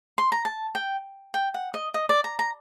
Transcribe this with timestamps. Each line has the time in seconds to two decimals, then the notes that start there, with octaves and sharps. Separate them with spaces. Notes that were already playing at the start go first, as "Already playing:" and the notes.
0.18 C6
0.32 A#5
0.45 A5
0.75 G5
1.34 G5
1.54 F#5
1.74 D#5
1.94 D#5
2.09 D5
2.24 A#5
2.39 A#5